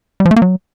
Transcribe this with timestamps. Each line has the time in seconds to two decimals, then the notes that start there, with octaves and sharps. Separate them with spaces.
0.20 G3
0.25 F3
0.31 A3
0.36 A#3
0.42 F#3